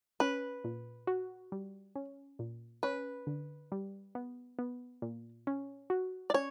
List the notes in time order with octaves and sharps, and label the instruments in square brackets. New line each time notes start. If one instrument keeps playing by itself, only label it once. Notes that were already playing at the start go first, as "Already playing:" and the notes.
[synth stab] C#4 [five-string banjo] B4
[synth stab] A#2
F#4
G3
C#4
A#2
[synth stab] C#4 [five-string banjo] B4
[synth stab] D3
G3
B3
B3
A#2
C#4
F#4
[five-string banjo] D5
[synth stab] C#4 [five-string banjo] C#5